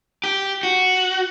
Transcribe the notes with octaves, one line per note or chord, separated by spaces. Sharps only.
G4
F#4